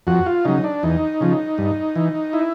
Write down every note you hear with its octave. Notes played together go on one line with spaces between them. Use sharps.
F2 F#4
F4
C#3 F#3 D#4
D4
E2 D#4
C#3 F3
G2
E3
E4